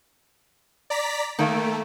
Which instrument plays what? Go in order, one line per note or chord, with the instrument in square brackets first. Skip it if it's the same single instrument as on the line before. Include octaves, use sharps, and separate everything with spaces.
[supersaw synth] D5 A#5 B6
[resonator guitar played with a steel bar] D#3 A#3 [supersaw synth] A3